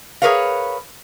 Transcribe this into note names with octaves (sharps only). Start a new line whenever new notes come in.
G#4 A#4 B4 C#5 F5